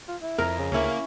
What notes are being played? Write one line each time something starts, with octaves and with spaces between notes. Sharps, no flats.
F4
E4
F2 A#4
C#3
D2 A#3 C#4 E4
A#3